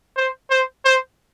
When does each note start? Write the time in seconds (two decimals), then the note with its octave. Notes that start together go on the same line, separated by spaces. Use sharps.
0.16 C5
0.50 C5
0.85 C5